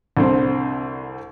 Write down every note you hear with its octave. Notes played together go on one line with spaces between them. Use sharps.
C2 D3 C4